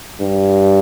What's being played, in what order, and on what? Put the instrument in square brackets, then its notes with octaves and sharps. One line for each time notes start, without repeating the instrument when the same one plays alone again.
[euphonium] G2